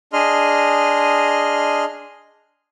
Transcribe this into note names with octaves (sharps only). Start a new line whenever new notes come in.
D4 G#4 D#5 C6 F6